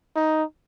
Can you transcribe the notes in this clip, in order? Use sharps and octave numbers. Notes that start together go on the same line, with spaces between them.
D#4